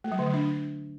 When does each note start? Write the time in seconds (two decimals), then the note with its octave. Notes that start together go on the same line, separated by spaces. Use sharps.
0.04 A3
0.12 F#3
0.19 D3
0.26 F#3
0.33 D4